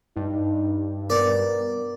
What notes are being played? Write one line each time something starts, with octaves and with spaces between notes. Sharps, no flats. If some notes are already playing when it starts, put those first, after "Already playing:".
G2 D#4
B3 A#4 D5